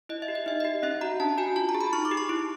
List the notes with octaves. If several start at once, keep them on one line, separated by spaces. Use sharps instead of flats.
E4 D#5
E5
G4
D#5
D#4 E5
D#5
G4
C#4 E5
F#4 A#5
D4 A5
F#4 G#5
F4 A5
A#5
G#4
B5
D#4 C#6
D6
G4
C#6
E4